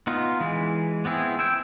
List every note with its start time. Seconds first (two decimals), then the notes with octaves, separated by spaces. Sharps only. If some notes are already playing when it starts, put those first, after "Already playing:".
0.07 B3 D#4 F4
0.40 E3 G#3
1.05 B3 C4 E4 G#4
1.39 E4 E5 G5